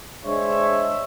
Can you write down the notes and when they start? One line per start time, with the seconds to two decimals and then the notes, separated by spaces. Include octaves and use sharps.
0.25 G#3 D4 C5 C#5 E5